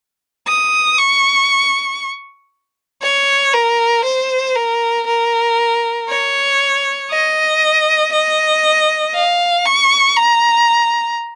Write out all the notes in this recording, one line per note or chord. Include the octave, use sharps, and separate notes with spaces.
D#6
C#6
C#5
A#4
C5
A#4
A#4
C#5
D#5
D#5
F5
C#6
A#5